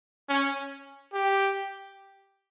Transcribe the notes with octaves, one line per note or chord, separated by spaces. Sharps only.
C#4
G4